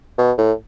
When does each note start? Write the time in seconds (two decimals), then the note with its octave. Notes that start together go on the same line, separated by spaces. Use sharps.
0.18 B2
0.38 A2